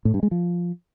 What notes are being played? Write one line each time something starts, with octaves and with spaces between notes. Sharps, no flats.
A2
G2
G#3
F3